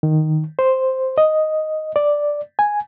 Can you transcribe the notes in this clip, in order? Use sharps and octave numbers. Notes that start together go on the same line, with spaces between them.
D#3
C5
D#5
D5
G#5